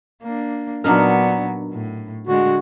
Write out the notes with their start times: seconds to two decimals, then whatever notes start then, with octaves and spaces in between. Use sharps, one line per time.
0.22 A#3 D4
0.84 A#2 F#3 B3 D4 D#4 A#4
1.72 A2
2.27 D3 G#3 F#4